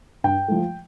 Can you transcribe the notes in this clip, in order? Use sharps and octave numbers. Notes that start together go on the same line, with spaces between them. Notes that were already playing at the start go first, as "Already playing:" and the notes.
G2 G5
F3 A3